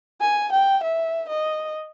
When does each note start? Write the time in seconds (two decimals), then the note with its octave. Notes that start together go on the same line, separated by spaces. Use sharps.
0.21 G#5
0.52 G5
0.83 E5
1.29 D#5